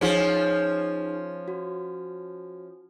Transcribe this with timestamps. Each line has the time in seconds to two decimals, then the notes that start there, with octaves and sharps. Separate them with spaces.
0.01 F3 C#4 D#4 G#4 D7
1.48 F#4